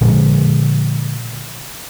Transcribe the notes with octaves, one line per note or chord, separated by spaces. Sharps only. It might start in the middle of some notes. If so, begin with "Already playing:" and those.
A#2 D3 F3 G#3